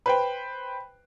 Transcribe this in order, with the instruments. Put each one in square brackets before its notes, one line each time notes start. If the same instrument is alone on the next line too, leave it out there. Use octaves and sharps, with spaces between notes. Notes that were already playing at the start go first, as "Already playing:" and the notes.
[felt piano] B4 C5 G5